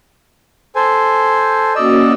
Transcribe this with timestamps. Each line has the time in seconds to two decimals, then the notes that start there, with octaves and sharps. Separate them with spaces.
0.75 A4 C5 G#5
1.76 A#3 C#4 F#4 D5 D#5 E6